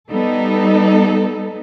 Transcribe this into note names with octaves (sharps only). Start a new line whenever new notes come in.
G3 B3 D#4 A4